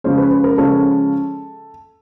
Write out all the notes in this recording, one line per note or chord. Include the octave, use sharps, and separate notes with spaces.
C#3 F3 G#3 C#4 C5
B4
B4
A#4
C#3 F3 G#3 C#4 A4